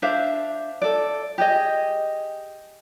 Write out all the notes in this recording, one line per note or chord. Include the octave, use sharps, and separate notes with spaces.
D4 C5 E5 F5
A4 D5
G4 G#4 D#5